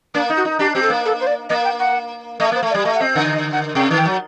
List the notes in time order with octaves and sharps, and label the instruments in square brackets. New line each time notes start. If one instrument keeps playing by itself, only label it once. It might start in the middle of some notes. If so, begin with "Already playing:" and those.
[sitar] A#3 [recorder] D4
[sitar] D#4
[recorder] F#4
[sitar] D#4
[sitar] D4 [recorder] G4
[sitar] C4 [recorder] G4
[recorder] A4
[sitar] A#3
[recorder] A4
C5
D5
[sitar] A#3 [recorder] D#5
[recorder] G5
F#5
[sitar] A3 [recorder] D#5
[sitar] A#3 [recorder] C5
[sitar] A3
[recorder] D5
[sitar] G3
[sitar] A3 [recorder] D#5
[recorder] F#5
[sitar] C4 [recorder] D#5
[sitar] D3 [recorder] F#5
[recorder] D#5
F#5
[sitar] C3 [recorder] G5
[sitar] D#3
[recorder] G5
[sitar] F#3